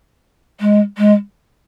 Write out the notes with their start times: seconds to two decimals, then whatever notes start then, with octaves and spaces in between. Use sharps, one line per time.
0.61 G#3
0.98 G#3